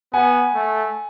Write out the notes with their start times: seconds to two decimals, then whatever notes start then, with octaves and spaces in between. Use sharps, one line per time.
0.13 B3 F#5 G#5
0.55 A3